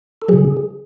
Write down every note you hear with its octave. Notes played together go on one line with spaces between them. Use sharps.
A4
C#3 F#3 G#4